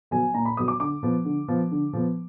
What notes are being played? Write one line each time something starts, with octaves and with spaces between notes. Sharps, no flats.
F#3 B3 G#5
A#2 A#5
B5
F#3 B3 D#6
D6
D3 D6
F3 B3
D3
F3 B3
D3
F3 B3